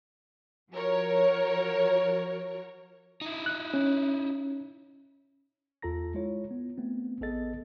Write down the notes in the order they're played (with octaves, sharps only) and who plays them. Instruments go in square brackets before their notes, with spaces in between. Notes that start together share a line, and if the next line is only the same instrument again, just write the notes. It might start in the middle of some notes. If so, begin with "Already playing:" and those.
[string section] F3 F#4 A#4 C#5
[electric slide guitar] D#4 E4
[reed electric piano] F#6
C#4
[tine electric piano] E2 F4 A4 A#5 A#6
G#3 E4 F4 C#5
B3
A3 B3 C4
A1 B3 G#4 A4 D#5 A6